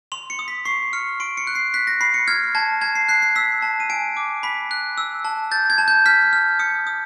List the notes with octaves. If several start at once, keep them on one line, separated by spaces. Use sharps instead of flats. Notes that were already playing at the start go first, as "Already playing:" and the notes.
C6 F7
C#7
D#6
B6
C#6 C7
F6 C#7
C6 D7
C#7
F#6
C7
F#6 B6
A#6
B5 C7
C#7
F6 G#6
A5 G#6
A5 G#6
C7
F#6 C7
C7
E6 B6
A5
D#7
G#5 D7
D6
B5 B6
F#6
E6
A5
G6 A6
G#6
A5
G6
F6 B6
F6
D#6 C#7
D#6